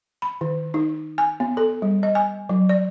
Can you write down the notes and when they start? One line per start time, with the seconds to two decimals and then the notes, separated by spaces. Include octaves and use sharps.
0.22 B5
0.41 D#3
0.74 D#4
1.18 G#5
1.40 B3
1.57 A4
1.82 G3
2.03 D#5
2.15 G#5
2.49 F#3
2.69 D5